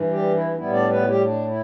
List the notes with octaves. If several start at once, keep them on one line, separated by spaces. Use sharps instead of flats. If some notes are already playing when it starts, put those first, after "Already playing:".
Already playing: G2 E3
G3 G4
E4
A2 G3 B3 E4
D4 D5
B3 B4
E4
G3 G4
D4
E4